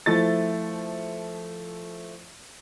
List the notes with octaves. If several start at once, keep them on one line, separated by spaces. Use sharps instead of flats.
F3 A3 E4 A6